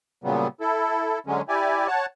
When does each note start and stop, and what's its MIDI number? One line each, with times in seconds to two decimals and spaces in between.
0.24 0.48 46
0.24 0.48 49
0.24 0.48 54
0.24 0.48 55
0.24 0.48 59
0.61 1.19 64
0.61 1.19 69
1.27 1.42 50
1.27 1.42 54
1.27 1.42 56
1.27 1.42 61
1.49 1.87 64
1.49 1.87 67
1.49 1.87 74
1.49 1.87 80
1.87 2.06 73
1.87 2.06 78
1.87 2.06 81